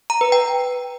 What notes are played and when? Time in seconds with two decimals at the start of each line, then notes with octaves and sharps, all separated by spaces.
0.10 A#5
0.21 B4
0.32 G5